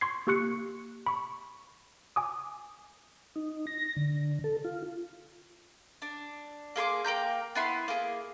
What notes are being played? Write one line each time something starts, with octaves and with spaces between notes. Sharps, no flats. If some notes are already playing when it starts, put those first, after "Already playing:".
C6 C#6 G#6 C7
A#3 G4 C#6 F#6 C#7
B5 C#6
G#5 D6 D#6
D#4
A#6
D3
A4
F4
D4
A#3 G#4 C6 D6
A#3 G5 A#5 G6
B3 E4 C6
A#3 G#4